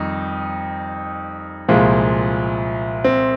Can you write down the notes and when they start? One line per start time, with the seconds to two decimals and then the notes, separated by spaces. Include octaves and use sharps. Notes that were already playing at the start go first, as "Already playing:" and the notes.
Already playing: F2 D#3 G3 D#4
1.68 C2 A#2 F3 G#3
3.04 C4